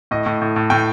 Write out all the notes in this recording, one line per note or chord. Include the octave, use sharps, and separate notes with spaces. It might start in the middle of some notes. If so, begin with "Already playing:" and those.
A2 D#5
A2
A2
A2
A2 G5